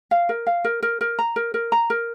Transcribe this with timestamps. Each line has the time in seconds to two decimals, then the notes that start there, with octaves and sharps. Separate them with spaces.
0.11 F5
0.29 A#4
0.47 F5
0.64 A#4
0.83 A#4
1.01 A#4
1.19 A#5
1.36 A#4
1.54 A#4
1.72 A#5
1.90 A#4